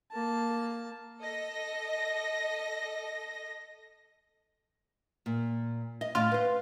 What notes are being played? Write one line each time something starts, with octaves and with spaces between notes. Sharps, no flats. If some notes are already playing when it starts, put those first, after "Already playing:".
A#3 A5
A4 D#5 A#6
A#2
D#5
A2 F4
B4 C5